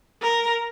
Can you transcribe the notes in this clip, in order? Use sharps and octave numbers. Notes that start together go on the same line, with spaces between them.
A#4